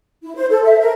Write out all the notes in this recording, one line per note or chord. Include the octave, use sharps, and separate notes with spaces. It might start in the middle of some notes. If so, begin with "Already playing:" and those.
E4
C5
A4
E5
A#4